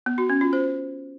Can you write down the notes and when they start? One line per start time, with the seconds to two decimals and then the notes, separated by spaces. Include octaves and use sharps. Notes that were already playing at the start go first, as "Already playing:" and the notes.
0.06 B3
0.18 F#4
0.30 C#4
0.41 F4
0.53 C5